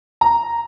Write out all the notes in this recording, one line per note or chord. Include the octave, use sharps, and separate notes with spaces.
A#5